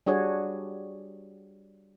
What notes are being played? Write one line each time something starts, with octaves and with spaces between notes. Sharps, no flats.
G3 D4 F#4 G#4 C#5